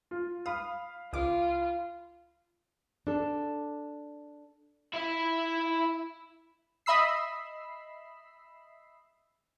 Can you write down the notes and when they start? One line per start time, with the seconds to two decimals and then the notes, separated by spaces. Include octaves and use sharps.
0.11 F4
0.46 F5 B5 D#6 F6
1.13 C#2 F4 D6
3.07 D4 A4
4.94 E4 E5
6.86 D#5 E5 B5 E6 C7